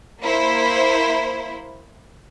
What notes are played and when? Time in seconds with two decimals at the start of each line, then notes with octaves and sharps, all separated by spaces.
0.21 A#3 E4 C5